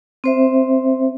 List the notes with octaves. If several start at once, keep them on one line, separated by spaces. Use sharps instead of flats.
C4 C5 E5